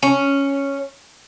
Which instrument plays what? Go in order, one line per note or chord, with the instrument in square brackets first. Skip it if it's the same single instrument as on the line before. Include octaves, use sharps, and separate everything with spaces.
[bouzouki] C#4